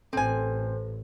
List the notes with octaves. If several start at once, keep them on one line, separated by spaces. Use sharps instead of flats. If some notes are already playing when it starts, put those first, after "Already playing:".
A1 C4 A4 C5 G#5